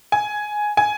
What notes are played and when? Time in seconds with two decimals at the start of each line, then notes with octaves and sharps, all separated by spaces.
0.12 G#5
0.77 G#5